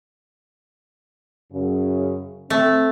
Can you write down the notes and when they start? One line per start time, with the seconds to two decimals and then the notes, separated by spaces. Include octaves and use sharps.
1.51 F#2 C#3
2.50 A3 C4